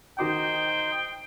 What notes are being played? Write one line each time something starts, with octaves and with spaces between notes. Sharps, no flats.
D#3 D#4 F#4 C5 G5 D6